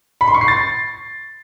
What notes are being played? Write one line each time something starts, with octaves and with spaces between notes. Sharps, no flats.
B5
C6
C#6
C7
A6